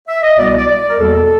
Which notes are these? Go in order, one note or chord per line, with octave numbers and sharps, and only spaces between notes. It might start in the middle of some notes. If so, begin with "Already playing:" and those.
E5
D#5
C2 B2 G3 B3 D5
D#5
D5
D5
A#4
E2 B2 G3 A#3 A4